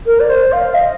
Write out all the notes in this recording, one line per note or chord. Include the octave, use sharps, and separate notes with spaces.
A#4
D5
C5
F5
D#5